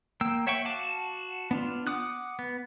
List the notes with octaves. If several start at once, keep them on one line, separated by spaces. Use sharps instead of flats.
A#3 G5 E6
C#5 E5 F#5 G5 C#6
F#4 F5 F#5 A5 D6
B3 D4 F4
F#5 D6 D#6 F#6
B3